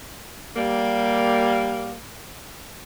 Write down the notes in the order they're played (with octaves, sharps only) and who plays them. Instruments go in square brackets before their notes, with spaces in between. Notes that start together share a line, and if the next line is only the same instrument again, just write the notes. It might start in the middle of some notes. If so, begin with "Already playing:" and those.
[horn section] G3 A#3